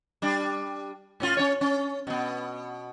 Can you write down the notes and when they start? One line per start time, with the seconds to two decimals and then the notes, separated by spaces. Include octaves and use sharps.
0.22 G3 D4
1.20 A2 C#4 F4
1.37 C#4 C#5
1.61 C#4
2.07 B2 B3